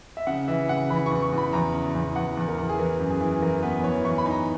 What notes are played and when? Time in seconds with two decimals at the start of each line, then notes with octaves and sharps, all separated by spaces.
0.17 E5
0.27 C#3 F#5
0.48 E3 E5
0.69 C#3 F#5
0.90 E3 B5
1.06 C#6
1.11 E2
1.22 C#6
1.33 E2
1.38 B5
1.53 E2 A#5
1.74 C#3
1.95 E2
2.16 E2 F#5
2.37 E2
2.48 A#4
2.58 E2
2.69 G#4
2.79 E3 A#4
3.00 F#2
3.10 G#4
3.21 E3
3.42 E3 A#4
3.63 B3 B4
3.83 E3 C#5
4.04 E3 C#6
4.18 B5
4.26 D#4
4.31 A#5